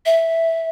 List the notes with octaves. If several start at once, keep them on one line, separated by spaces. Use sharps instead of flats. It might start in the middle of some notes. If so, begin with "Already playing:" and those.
E5